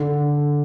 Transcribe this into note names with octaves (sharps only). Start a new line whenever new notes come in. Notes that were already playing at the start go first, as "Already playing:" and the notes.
Already playing: D3